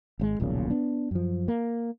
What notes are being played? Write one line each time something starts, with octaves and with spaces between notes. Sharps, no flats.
G#1 C3 G#3
D#1 B1 A#2 C#3
B3 D4
F#2 F3
A#3